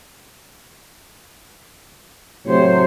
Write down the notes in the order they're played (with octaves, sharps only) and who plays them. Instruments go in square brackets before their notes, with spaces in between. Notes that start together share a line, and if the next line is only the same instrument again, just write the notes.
[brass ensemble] A2 C3 F#3 [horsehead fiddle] C5 C#5